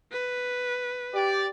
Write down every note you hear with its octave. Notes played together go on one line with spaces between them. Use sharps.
B4
G4 D5